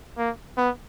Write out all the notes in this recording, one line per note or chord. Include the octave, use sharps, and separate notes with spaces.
A#3
B3